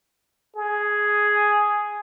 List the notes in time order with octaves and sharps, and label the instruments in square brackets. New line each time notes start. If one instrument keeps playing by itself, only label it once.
[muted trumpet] G#4